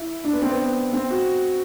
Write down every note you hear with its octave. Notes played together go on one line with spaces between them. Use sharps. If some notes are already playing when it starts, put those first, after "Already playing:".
Already playing: E4
D4
B3
C4
B3
C4
F#4